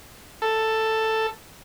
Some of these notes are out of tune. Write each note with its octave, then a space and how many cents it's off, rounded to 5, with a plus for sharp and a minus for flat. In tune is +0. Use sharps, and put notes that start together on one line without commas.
A4 +5